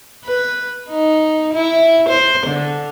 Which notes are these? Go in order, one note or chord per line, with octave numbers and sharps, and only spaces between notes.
B4
D#4
E4
C5
D3